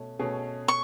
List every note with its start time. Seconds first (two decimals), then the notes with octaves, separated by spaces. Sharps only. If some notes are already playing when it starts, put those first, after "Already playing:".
Already playing: B2 A3 C#4
0.19 B2 A3 C#4 G#4
0.68 C#6